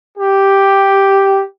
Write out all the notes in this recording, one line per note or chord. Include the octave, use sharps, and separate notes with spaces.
G4